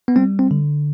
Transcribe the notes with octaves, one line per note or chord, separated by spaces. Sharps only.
B3
G3 C4
C4
D3